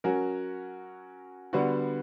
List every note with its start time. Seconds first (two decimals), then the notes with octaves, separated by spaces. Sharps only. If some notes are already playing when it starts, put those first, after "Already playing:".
0.04 F#3 C#4 F#4 A#4
1.53 D3 G3 B3 F#4